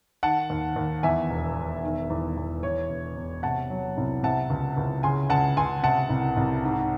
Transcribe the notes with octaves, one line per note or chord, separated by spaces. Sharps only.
D#3 F#5 A5
D#2
D#2
E2 E5 G#5
E1
E1
D#3
E2
E2
E2 C#5
E1
E1
C3 F#5 A5
F#3
C2
C3 F#5 A5
C#2
C#2
C#3 G#5 C6
C#2 F#5 A5
C#2 G#5 C6
C3 F#5 A5
C2
C2
G#2